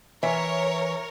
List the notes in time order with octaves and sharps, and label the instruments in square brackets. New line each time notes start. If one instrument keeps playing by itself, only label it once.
[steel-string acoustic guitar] E3 E5 [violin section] A#4 C#5